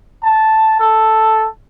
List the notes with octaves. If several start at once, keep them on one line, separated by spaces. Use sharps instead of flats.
A5
A4